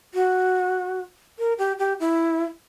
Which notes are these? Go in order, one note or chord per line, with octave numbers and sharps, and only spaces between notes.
F#4
A#4
G4
G4
E4